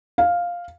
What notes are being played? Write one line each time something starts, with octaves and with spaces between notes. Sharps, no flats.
F5